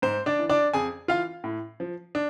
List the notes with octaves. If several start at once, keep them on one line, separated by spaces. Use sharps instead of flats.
G#2 C5
D4 D5
E3
D4 D5
F2 G#4 G#5
E3 F4 F5
A2
F3
D4